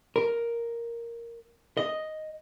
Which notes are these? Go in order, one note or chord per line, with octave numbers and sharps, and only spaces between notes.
A#4
D#5